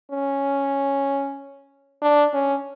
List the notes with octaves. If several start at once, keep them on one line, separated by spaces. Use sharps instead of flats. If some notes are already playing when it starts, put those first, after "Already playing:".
C#4
D4
C#4